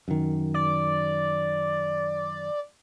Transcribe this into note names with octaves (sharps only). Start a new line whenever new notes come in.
F#2 D#3
D5